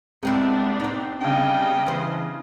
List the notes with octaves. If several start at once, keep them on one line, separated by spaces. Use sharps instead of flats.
C2 G#3 B3 C4 D4 E4
C4 D#4
C#3 G3 B3 D4 D#5 G5
E3 C5